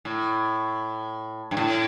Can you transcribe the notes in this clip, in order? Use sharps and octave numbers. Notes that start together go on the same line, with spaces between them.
A2
G2
A2